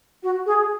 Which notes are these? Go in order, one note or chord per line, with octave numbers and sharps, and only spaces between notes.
F#4
G#4